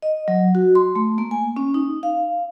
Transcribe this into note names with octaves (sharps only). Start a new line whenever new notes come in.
D#5
F#3
F#4
C6
A3
A#3
G#5
C#4
D#4
F5